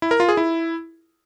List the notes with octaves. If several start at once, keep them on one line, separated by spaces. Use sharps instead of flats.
E4
A#4
F4
G#4
E4